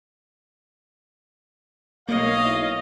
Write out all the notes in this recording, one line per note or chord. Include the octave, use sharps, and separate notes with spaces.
B1 A#3 C#5 D#5 F5
E4